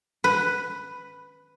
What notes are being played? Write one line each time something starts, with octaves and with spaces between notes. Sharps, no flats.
B4